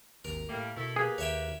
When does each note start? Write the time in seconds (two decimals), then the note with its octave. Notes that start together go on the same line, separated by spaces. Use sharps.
0.25 G#1 D#2 A#4
0.49 A2 G3 A3 A#3
0.77 B2 E4 A4
0.96 A#3 G4 G#4 B4
1.18 D#2 C#5 E5 G5